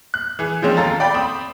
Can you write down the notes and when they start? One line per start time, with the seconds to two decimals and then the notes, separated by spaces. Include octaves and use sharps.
0.14 F#6
0.39 E3 G#4
0.62 F3 G#3 C4 C#4
0.77 D#2 F4 A4 A#5 A6
1.00 D5 G5 B5
1.14 C4 B5 D#6